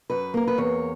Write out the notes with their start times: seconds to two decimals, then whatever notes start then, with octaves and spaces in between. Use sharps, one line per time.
0.10 F#2 B4
0.34 A#3 A#4
0.47 B4
0.58 E2 C#5